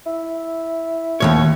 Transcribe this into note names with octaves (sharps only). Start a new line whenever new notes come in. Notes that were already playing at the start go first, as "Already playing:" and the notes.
E4
D#2 C#3 C#5